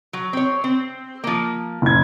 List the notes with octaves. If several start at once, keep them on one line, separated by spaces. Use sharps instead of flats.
F#3
C4 C#5
C4
F3 A#3
F#1 G#6